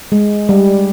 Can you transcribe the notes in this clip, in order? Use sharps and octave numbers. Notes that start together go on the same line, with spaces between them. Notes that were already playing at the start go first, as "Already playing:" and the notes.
G#3
G3